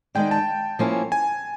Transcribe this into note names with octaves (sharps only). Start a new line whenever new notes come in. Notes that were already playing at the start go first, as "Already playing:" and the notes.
D#3 G#3 B3 D4 G5
A5
F3 A#3 C#4 E4
G#5